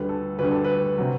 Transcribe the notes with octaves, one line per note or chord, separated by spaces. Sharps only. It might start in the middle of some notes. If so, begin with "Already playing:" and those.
Already playing: D2 D3 G3 B4
A4
D2 D3 G3 B4
A4
B4
C3 F#3